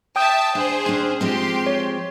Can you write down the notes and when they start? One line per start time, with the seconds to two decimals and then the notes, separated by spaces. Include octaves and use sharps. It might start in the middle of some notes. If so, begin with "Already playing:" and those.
0.16 E5 G5 A5 D#6 G6
0.55 D4 G#4 C5
0.86 C#4 D4
1.21 F3 G#3 C4 G4 C6
1.67 C#5